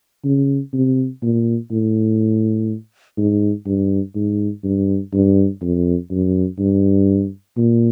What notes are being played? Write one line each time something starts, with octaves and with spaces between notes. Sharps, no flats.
C#3
C3
A#2
A2
G#2
G2
G#2
G2
G2
F2
F#2
G2
A#2